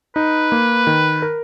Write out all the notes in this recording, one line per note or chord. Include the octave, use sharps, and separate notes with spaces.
D#4 B4
A#3
D#3
A#4